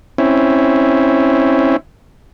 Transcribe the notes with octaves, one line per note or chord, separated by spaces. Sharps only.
C4 C#4 E4